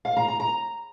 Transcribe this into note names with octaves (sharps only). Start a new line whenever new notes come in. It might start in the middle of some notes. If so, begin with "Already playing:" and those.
F5
A#5
A#5
A#5